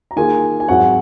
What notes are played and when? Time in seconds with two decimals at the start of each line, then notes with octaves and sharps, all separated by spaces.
0.11 A#5
0.16 D#3 A#3 F4 G#4 G#5
0.60 G#5
0.68 G#2 F#3 C4 F#4 F#5